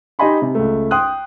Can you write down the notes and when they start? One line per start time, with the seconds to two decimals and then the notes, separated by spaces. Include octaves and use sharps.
0.19 D#4 G4 D#5 G#5 B5 C6
0.42 C3
0.55 C#2 A3
0.91 G5 C6 D#6 F#6